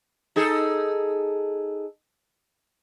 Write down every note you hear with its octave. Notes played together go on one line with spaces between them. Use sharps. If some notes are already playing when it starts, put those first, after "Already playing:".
D#4 G#4 A4